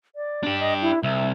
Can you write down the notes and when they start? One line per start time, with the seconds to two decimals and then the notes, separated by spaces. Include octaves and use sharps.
0.16 D5
0.43 D4 G4
0.60 D#5
0.82 E4
1.03 C2 E5